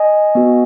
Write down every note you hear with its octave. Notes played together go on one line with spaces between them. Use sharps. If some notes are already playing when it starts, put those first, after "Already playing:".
Already playing: D#5 G#5
B3 F#4